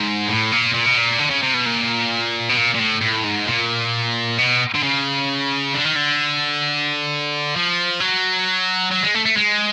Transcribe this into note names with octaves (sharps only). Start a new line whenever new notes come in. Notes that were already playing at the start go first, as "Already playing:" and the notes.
Already playing: G#2
A2
A#2
A#2
B2
A#2
D3
C#3
C3
B2
A#2
B2
A#2
A#2
A2
A2
G#2
A#2
B2
D3
C#3
D3
D#3
D3
F3
F#3
F#3
G#3
A3
A3
G#3